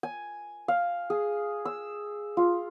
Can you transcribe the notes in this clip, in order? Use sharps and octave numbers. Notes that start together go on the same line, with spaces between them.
G#5
F5
G#4
E6
F4